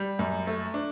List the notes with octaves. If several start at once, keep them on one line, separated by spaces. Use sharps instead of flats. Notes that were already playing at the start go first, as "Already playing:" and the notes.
Already playing: G3
F#2
A3
D4